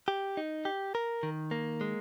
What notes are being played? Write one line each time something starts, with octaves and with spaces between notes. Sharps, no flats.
G4
D#4
G4
A#4
D#3
A#3
G#3